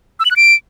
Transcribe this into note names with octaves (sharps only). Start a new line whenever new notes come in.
E6
F#7
F#6
D7